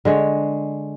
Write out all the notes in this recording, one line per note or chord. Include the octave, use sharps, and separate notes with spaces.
D3 G#3 C#5